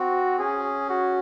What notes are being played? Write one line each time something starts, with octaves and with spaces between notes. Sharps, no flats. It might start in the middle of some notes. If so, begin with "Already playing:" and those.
Already playing: C4 F#4
C#4 G#4
F#4